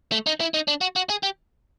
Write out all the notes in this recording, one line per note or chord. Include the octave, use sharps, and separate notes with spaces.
A3
D#4
E4
D#4
D4
F#4
F#4
G#4
G4